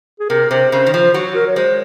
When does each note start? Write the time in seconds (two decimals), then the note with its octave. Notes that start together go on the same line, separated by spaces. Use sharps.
0.20 G#4
0.29 C3 A#4
0.51 C3 C5
0.72 C#3 C5
0.86 D#3
0.93 F3 C5
1.14 F#3 F#4
1.35 A#4
1.47 C#5
1.56 G#3 C5